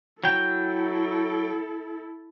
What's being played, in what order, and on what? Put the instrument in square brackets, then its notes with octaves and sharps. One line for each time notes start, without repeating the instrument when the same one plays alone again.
[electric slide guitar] F#3 G5 [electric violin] E4 A4